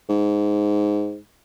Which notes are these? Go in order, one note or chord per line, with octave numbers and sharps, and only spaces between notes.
G#2